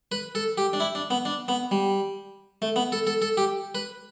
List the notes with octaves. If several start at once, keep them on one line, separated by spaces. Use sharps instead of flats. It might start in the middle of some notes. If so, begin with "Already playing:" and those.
B4
A4
G4
D4
E4
D4
B3
D4
B3
G3
A3
B3
A4
A4
A4
G4
B4